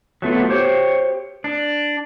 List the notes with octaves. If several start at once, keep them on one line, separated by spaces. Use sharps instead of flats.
F#3 A3 B3 F4
G4 C5 C#5
D4